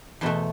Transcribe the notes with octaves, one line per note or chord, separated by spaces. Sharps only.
E2 B2 A3 C5